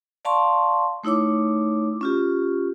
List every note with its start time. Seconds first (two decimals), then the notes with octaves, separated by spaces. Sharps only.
0.25 D5 F5 A5 C6 C#6
1.03 A3 D#4 E4 C#5 D6
2.01 C#4 F4 G4